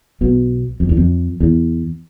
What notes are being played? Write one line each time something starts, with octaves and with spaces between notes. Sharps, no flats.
B1 B2
F2
E2
F2
E2